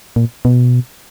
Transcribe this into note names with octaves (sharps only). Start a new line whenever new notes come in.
A#2
B2